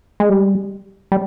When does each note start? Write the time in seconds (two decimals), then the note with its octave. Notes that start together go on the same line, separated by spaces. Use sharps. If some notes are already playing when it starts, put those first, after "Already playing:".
0.20 G#3
0.29 G3
1.12 G3